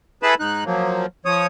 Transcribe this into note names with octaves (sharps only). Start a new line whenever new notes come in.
E4 G#4 A4 B4 A5 B5
G#2 D#4 F#6
F3 F#3 A#3
F3 C#5 D#6